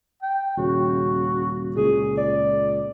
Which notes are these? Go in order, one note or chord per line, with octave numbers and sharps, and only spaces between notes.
G5
D#1 C#3 F#4
C#2 A#2 G#4
D5